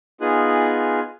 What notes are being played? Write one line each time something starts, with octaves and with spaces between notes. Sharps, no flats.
B3 D#4 F4 G#4 G#5 F#6